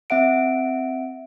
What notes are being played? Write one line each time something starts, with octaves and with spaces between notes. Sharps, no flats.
C4 E5 F#5 D7